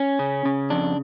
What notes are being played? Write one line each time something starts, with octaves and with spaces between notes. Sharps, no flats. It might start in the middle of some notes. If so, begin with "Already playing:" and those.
Already playing: C#4
C#3
C#3
F2 D4